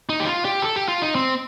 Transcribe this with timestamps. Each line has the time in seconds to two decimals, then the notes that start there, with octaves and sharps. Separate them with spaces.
0.09 D#4
0.20 G4
0.26 F4
0.45 G4
0.62 A4
0.76 G4
0.88 F4
1.02 D#4
1.15 C4